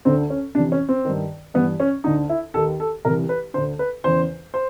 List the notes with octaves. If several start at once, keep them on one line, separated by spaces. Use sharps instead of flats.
D2 D3 C4
C#4
F2 C3 E3 D4
C#4
C4
G2 D#3
G2 E3 B3
C#4
D2 D3 D#4
E4
D#2 D#3 A4
A4
C2 C3 E3 A#4
B4
D2 D3 C5
B4
E2 C#3 E3 C5
C5